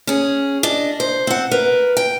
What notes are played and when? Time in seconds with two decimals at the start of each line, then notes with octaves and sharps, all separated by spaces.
0.07 C#4 G#4
0.63 D4 D#5
1.00 C5
1.27 C4 F#5
1.51 A#4 B4
1.97 G5